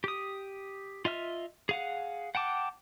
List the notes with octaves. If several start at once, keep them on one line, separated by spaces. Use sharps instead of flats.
G4 D#6
F4 D#5 E5 F6
G#4 F5 F#5
F#5 G5 A5 D6